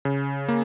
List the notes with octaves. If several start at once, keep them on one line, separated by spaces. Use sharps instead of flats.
C#3
A#3